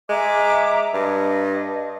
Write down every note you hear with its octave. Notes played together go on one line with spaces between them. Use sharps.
G#3 E5 A#5 D6
G2 D#5